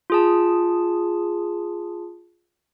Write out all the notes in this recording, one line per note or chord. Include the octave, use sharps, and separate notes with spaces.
F4 G#4 A5